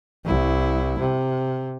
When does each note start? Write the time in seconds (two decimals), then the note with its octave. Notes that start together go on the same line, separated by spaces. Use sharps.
0.25 C2 E4
0.99 C3